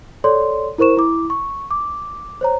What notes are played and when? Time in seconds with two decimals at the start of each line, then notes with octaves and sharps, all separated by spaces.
0.24 A4 C#5 D5 C6
0.78 E4 A#4 C5 C#6 E7
0.97 E4 D6
1.30 C#6
1.71 D6
2.41 C5 C#5 A#5